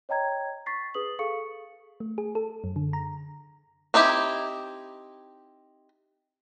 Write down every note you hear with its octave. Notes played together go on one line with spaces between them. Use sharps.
C#5 D#5 G5 A#5 G#6
C#6 A6 B6 C7
G#4 B4 D#6 F#7
G#4 A4 F5 C#6 C#7
A3
G#4
A4
F#2
D3
A#5
C4 D#4 E4 G4